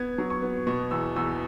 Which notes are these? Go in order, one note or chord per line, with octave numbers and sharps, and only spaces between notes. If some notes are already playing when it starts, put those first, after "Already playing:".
Already playing: B3 G#6
F#3
C#6
B3
B2 C#6
E2 E6
E2 E6